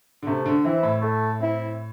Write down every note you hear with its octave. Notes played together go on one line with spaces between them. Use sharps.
D3
C3 A3
D3
E3 C4 E4
A2
A3
C4 E4